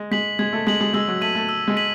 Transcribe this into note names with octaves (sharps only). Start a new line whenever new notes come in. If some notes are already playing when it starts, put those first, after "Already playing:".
Already playing: G#3
G#3 B6 F#7
G#3 G#6
A3
G#3 B6 F#7
G#3
G#3 E6
F#3
A3 B6 D#7 F#7
A3
E6
G#3
B6 D#7 F#7